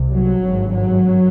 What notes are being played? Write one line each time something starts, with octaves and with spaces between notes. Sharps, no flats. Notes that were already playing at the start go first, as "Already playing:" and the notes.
Already playing: C2 C3
F#3
G#1 G2
F#3